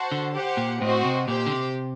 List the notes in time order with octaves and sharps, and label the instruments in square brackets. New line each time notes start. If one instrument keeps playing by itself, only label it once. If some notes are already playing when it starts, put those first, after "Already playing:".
Already playing: [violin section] F#4 C5 F#5 A5
[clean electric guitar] D3
[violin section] G4 C5 F#5
[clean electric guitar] A#2
[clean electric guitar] A2 [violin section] C4 F#4 C5 D#5
[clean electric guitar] C3
[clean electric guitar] A#2 [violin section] G4 C5 G5
[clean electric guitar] D3
C3